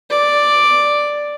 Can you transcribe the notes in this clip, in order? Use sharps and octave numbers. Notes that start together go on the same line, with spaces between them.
D5